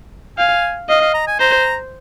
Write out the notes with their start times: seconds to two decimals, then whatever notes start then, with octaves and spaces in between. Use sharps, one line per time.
0.38 F5 G#5
0.89 D#5 F5
1.02 F5
1.14 A#5
1.27 G#5
1.40 C5 A#5